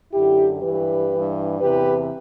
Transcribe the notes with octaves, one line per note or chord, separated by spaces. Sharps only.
F#2 D3 E4 G4
G2 E3 G4 B4
G2 E3
E2 C3 E3 G4 B4